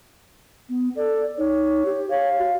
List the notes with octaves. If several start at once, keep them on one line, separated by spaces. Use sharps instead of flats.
B3
A4 D5
D#4 C#5
G4
C#5 F5
F#4